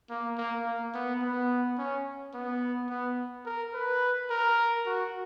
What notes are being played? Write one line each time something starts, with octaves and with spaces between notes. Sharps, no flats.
A#3
A#3
A#3
B3
B3
C#4
B3
B3
A#4
B4
A#4
F#4